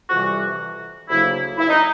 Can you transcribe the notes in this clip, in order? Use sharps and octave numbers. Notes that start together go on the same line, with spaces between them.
F2 C3 E3 G3 F#4
D2 C#3 F#3 A#3 E4
E4
D#4